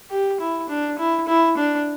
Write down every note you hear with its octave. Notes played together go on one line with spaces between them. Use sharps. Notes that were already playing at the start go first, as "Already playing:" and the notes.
G4
E4
D4
E4
E4
D4